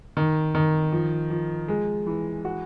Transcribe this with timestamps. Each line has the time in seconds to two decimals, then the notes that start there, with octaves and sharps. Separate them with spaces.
0.17 D#3
0.55 D#3
0.92 F3
1.30 F3
1.68 G#3
2.06 E3
2.45 F#4